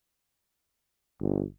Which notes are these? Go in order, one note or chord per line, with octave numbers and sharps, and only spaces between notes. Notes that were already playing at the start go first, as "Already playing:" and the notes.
G1